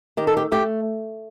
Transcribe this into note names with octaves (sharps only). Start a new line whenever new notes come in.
D#3 G4
A4
G4
A3 G4